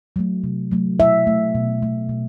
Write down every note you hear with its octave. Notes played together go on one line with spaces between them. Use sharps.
F#3 A3
C3
F#3 A3
B2 E5
A3
B2
A3
B2